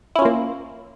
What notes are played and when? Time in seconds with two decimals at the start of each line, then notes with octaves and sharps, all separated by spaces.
0.15 E4
0.19 C#4
0.22 F4
0.25 A#3